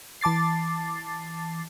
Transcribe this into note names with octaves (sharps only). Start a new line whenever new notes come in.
E3 A5 D6 A6 C7